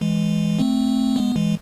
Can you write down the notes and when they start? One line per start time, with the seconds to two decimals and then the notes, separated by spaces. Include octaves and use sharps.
0.01 E3 G#3
0.59 A3 C4
1.16 G#3 B3
1.35 E3 G#3